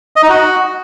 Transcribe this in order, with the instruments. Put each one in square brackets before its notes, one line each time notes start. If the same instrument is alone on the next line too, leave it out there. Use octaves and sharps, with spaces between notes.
[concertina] D#5
D#4
F#4